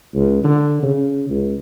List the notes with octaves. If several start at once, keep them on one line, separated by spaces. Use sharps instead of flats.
C#2
D3
C#3
C#2